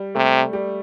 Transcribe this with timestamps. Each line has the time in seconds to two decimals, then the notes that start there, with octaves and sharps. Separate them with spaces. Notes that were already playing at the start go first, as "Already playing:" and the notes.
Already playing: G3
0.15 C3 A3
0.53 G3